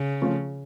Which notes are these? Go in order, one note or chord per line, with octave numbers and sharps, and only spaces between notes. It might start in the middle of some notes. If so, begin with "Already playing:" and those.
Already playing: C#3
F3 A3 C#4 F4